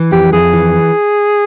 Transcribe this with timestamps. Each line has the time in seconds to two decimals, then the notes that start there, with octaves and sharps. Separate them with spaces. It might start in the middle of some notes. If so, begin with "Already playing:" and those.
Already playing: E3
0.12 F2 G4
0.32 F2 G#4
0.53 E3